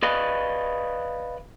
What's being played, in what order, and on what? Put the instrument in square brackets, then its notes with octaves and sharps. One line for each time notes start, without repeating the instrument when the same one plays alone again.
[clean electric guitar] B4 D5 D#5 F5 B5